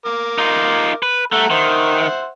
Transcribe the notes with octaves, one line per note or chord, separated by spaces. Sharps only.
A#4 D6
D#4 F4
B4
A3 A4 F#5 A#5
D#3 C5 E5 F#5